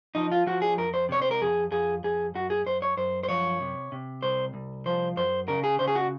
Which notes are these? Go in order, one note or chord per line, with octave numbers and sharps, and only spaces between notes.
F3 D#4
F4
F3 F#4
G#4
F2 A#4
C5
C3 C#5
C5
A#4
F2 G#4
F2 G#4
F2 G#4
F#2 F#4
G#4
F#2 C5
C#5
F#2 C5
C5
F3 C#5
C3
C3
C2 C5
C2
F3 C5
F#2 C5
C#3 A#4
G#4
C#3 C5
G#4
F#4